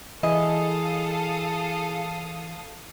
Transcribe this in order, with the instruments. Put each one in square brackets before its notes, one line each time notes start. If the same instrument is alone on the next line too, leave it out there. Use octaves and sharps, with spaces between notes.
[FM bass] E3 [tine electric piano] E4 G#4 [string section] A4 F5 D#6 [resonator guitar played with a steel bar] D#5